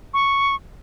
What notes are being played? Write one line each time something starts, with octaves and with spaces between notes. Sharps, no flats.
C#6